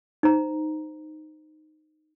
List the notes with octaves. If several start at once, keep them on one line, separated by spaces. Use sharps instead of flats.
D#4 C5 A#5